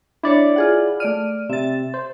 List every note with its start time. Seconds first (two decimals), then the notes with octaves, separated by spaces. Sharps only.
0.23 D4 E4 C#5 D5
0.56 F4 G#4 F#5
1.00 A3 D5 F6 D#7
1.49 C3 E5 A6
1.94 C5